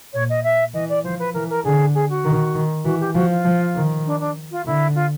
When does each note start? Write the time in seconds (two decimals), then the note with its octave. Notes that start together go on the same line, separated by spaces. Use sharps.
0.13 A#2 C#5
0.29 D#5
0.43 E5
0.74 E3 D#5
0.89 D5
1.04 F3 C5
1.19 B4
1.34 E3 A#4
1.49 A#4
1.64 D3 G#4
1.94 G#4
2.09 F#4
2.24 D#3
2.54 D#3
2.84 E3 F#4
3.00 G4
3.14 F3 F#4
3.29 F4
3.45 F3
3.75 D#3
4.06 D4
4.20 D4
4.51 F4
4.65 D3 E4
4.95 F4